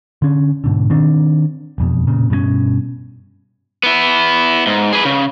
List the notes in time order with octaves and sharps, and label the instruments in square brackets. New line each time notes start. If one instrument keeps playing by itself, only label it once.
[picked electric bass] D3 C#4
G#2 B2 D3
D#3 C4 D4
E1 F2 B2
A#2 C#3
G2 B2 F3 C#4
[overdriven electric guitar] B3 E4
G#2
G#4 B4
C#3